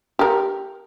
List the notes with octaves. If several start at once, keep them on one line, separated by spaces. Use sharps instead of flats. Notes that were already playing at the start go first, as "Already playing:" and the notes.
G4 A#4